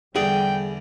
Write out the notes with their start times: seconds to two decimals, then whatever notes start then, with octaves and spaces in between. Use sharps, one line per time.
0.16 E2 D3 G3 G#4 D5 G5